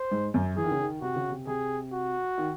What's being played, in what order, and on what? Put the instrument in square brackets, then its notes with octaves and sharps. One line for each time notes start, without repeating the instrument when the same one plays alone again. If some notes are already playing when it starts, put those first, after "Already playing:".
Already playing: [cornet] C5
[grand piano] G#2
F#2
[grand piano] E3 [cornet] G#4
[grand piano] D#3
C#3
D#3
[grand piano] C3 [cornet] F#4
[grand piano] C#3
C3
[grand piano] C3 [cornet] G#4
[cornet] F#4
[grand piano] D#3